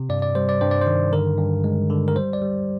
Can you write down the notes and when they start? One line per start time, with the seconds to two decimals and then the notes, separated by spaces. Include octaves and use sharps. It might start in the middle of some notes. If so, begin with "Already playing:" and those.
Already playing: C3
0.09 G2 D5
0.22 D5
0.35 G3 C5
0.49 D5
0.61 G2 C5
0.71 D5
0.81 D#3 C5
1.13 D3 A#4
1.38 G2
1.64 G#3
1.90 D3
2.08 A#4
2.16 G3 C5
2.33 D5
2.42 G3